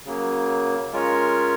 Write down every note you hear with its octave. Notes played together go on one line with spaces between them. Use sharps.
C#3 F#3 A#3
G#3 C#4 F4 A#4 C#5